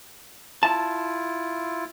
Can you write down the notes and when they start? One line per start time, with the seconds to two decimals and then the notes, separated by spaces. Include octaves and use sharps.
0.63 E4 F4 A5